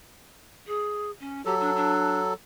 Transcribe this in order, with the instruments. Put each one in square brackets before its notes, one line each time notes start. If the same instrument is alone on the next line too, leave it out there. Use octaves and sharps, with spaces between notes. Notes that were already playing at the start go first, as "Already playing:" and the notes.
[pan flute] G#4
C#4
[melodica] F#3 A4 [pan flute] G4
[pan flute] D4
D4